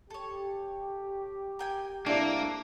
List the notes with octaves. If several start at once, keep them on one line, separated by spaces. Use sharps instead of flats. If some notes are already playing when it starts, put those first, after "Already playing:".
G4 A4 C#5
A#4 G5 G#5
C2 A#3 D4 E4 A4 D5